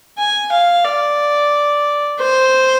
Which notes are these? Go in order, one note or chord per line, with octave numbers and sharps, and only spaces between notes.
G#5
F5
D5
C5